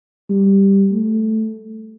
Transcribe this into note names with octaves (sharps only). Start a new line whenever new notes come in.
G3
A3